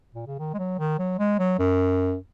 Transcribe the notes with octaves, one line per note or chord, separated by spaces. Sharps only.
A#2
C#3
D#3
G#3
F#3
D#3
F#3
G#3
F#3
F#2